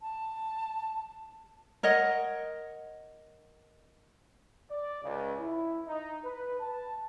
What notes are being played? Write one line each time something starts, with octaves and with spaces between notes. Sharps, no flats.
A5
A#4 C#5 D#5 F#5
D5
C#2
E4
D#4
B4
A5